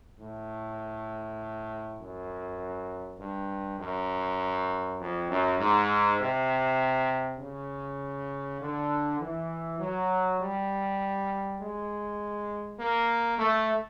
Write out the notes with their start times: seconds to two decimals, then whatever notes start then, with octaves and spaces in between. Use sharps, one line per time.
0.19 A2
1.99 F#2
3.19 G2
3.79 F#2
4.98 F2
5.29 F#2
5.59 G#2
6.18 C3
7.38 C#3
8.60 D3
9.19 E3
9.79 F#3
10.39 G3
11.59 G#3
12.79 A#3
13.39 A3